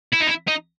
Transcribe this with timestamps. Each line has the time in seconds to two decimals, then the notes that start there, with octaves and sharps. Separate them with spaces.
0.13 E4
0.20 D#4
0.27 E4
0.48 D#4